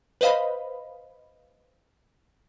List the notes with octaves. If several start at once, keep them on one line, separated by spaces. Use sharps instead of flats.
B4 C5 D#5 F5 B5